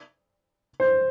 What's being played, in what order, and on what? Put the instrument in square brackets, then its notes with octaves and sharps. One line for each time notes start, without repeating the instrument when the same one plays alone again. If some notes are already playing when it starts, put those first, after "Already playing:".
[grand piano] C5